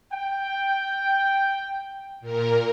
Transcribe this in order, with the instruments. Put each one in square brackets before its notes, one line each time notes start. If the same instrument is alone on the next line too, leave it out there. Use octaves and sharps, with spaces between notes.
[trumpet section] G5
[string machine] A#2 A#4